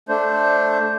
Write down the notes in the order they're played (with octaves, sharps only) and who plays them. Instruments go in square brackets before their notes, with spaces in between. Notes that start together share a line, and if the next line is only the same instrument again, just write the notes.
[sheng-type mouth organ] A3 D4 C5